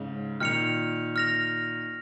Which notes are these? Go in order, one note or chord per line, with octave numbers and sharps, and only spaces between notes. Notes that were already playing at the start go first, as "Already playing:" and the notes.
Already playing: G#2 C#3
A#2 D#3 F6 C#7 F7
F6 A#6 F7